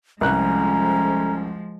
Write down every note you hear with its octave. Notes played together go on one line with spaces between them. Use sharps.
C2 F2 F3 G#3 C#4 A#5 F#6